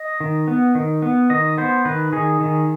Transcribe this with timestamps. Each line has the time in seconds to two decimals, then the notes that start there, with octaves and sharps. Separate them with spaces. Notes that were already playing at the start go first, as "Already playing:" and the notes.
Already playing: D#5
0.20 D#3
0.48 B3
0.75 D#3
1.02 B3
1.30 D#3 D#5
1.58 B3 C5
1.85 D#3 B4
2.13 D#3 G#4
2.40 D#3